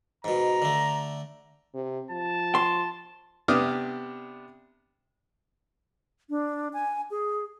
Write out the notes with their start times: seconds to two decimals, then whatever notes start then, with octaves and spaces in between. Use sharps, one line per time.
0.24 G#2 B2 A#5
0.62 D3 A3
1.74 C3
2.11 F3 A5
2.55 C6
3.48 C3 B3 D4 D6 D#6 F6
6.30 D4
6.73 G#5
7.10 G#4